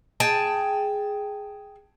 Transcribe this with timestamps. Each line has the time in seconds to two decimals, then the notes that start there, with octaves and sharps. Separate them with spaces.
0.20 G#4 G5 A5